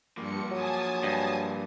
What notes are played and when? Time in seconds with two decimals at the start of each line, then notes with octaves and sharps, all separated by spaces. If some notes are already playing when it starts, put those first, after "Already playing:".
0.17 G2 F3 A#3 C#7
0.51 F#3 G#5 A5 D#6
1.03 G2